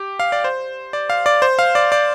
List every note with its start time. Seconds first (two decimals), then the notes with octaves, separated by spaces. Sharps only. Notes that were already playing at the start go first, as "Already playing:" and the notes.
Already playing: G4
0.20 F5
0.32 D5
0.44 C5
0.93 D5
1.10 F5
1.26 D5
1.42 C5
1.59 F5
1.75 D5
1.92 D5